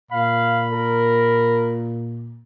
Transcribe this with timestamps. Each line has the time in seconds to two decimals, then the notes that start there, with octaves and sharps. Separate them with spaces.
0.11 A#2 F5 B5
0.73 A#4